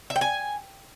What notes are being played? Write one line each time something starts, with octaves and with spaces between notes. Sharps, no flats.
E5
G5
G#5